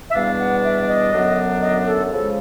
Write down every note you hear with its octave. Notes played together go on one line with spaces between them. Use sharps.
E5
E2 B2 G3 B3 D4 F5
F#5
E5
D#5
F#2 D3 F#3 B3 D4
D#5
A4
C#3 F3 G#3 A4